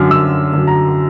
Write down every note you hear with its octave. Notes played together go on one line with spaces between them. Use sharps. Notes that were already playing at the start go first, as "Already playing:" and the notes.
Already playing: F#2 D3 F#3 F6
F#2 E6
D3 F#3
A#5